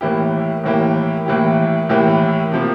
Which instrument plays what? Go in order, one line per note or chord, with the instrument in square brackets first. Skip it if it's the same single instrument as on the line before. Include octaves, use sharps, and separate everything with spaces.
[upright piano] A2 E3 A#3 E4 G4
A2 E3 A#3 E4 G4
A2 E3 A#3 E4 G4
A2 E3 A#3 E4 G4
C3 F3 A#3